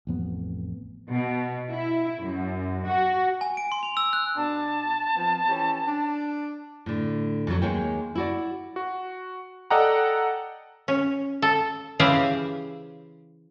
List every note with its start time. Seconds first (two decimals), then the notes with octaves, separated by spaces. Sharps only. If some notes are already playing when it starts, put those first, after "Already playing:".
0.07 A1 F2 B3
1.09 B2
1.71 E4
2.23 F#2
2.89 F#4
3.41 G#5
3.57 D7
3.72 C6
3.83 F7
3.97 E6
4.13 F#6
4.37 B2 D4 A5
5.16 F3 B3 C4
5.49 E3 C#4 G4
5.88 D4
6.86 A2 D3
7.47 F2 A2 D#3 F#3
7.62 D#2 G#3 A#3 C#5 G5
8.15 E4 F#4 D5
8.76 F#4
9.70 A4 D5 D#5 F#5 G5 A#5
10.88 C#4
11.42 A4
11.99 C#3 E3 G4 G#4 C5 F5